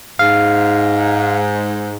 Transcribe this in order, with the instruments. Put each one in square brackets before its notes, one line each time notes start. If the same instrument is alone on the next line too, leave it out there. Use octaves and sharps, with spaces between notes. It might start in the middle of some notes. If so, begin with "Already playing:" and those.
[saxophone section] G#2 [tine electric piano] F5